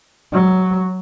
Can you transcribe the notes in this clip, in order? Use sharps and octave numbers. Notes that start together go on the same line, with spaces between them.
F#3